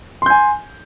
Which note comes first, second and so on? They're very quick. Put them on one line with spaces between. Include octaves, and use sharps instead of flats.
C6 G6 G#5